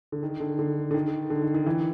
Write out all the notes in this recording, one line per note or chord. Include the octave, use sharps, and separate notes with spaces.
D3
D#3
D3
D3
D3
D#3
D3
D#3
D#3
E3